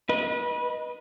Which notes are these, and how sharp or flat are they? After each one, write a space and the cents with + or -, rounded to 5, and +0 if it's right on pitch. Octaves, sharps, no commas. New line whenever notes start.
B4 -30 D#5 +0